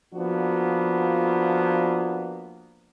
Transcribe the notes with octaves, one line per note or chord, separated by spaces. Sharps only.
F3 A#3 B3 D4 F#4